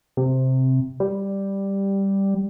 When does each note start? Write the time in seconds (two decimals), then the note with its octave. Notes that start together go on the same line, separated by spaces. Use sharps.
0.17 C3
1.00 G3